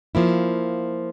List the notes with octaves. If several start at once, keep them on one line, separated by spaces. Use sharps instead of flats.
F3 A#3 E4